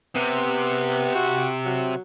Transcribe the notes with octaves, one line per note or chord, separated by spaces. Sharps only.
C3 B3
F#4
F#3